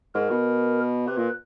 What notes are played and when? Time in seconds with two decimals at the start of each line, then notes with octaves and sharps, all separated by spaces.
0.14 G#2 A#4
0.30 B2
1.07 C3 B4
1.17 A#2